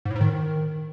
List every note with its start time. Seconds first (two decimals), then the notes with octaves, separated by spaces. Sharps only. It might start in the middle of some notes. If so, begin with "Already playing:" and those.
0.05 G#2
0.11 A2
0.16 G#2
0.21 D#3